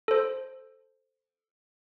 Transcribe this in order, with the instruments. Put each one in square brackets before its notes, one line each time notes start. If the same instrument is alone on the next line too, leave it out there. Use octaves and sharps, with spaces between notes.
[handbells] A4 C5